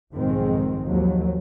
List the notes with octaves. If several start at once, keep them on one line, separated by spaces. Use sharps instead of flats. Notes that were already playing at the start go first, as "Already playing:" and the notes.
B1 F2 G#2 D#3 G#3 C4
D#2 F3 F#3